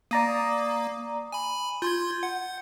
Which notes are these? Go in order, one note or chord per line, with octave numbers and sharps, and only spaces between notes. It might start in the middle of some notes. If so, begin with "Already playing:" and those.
A#3 D5 A#5 D#6
G#5 B5
F4 C6 G6 G#6
F#5